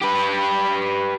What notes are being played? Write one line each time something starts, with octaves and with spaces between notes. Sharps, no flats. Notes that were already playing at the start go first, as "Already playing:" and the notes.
G4 B4